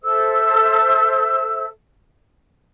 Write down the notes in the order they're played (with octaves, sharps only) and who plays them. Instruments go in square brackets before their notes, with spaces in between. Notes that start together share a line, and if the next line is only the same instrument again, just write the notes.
[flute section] A4 C5 E5 E6